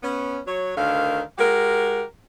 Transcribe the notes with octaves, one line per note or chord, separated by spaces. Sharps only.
B3 C#4
F#3 C#5
D2 D3 D#3 A#4 F5
G#3 F#4 G4 A#4